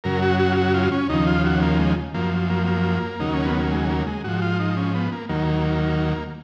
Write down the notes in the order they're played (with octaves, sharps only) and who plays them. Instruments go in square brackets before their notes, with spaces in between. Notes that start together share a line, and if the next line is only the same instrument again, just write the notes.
[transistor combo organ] F#2 C#3 F#3 A#4
F#4
F#4
F4
F#4
F4
C#4
D#2 C#3 F3 D#4
F4
F#4
A#3
G#3
F#2 F3 A#3
A#3
A#3
D#2 C#3 F#3 D#4
C#4
B3
A#3
G#3
A#3
G#3
G#2 F3 F#4
F4
D#4
C#4
B3
A#3
D#2 D#3 F#3 A#3